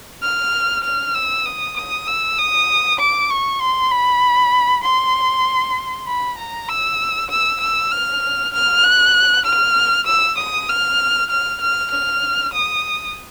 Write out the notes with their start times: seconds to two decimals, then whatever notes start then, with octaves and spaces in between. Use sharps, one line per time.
0.22 F6
0.84 F6
1.15 E6
1.46 D#6
1.77 D#6
2.07 E6
2.38 D#6
2.99 D6
3.30 C#6
3.61 C6
3.92 B5
4.84 C6
6.07 B5
6.38 A#5
6.69 E6
7.30 E6
7.61 E6
7.92 F6
8.53 F6
8.84 F#6
9.45 F6
10.07 E6
10.38 D#6
10.69 F6
11.30 F6
11.61 F6
11.91 F6
12.53 D#6